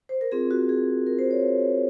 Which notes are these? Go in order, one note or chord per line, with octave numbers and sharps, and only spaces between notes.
C5
A#4
C4 F4 G#4
F#4
G#4
A#4
C5
C#5